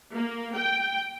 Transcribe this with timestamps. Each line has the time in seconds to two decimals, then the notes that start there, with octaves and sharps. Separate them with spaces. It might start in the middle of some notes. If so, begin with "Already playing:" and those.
0.14 A#3
0.55 G5